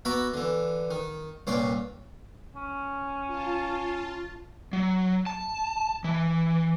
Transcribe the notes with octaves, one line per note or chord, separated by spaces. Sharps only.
B3 F#4 E5 A#5 B5 D6
D3 E3
D#3
C2 G2 A#2 C#4 C6 D6
C#4
F4 A5
F#3
A5
E3